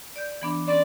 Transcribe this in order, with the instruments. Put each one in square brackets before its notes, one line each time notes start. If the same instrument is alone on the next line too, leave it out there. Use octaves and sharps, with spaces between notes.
[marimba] D5 G6
E3 B3 D4
[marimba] C#4 C6 [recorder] D5